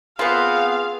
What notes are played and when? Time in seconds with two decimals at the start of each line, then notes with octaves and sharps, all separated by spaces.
0.19 B3 C4 F4 G#4 F5